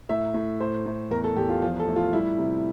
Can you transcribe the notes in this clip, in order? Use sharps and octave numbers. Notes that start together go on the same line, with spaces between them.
A2 E5
A2
A2 C5
A2
E2 A#4
A4
E2 G4
F4
F3 F4
A4
A2
F4
G3 E4
C3